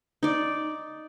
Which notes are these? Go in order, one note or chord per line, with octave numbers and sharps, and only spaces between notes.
D#4 D5